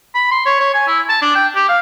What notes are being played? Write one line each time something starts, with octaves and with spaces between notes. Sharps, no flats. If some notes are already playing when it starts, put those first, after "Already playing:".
B5
C6
C#5
C#5
G#5
E4
A5
D4
G5
G4
F5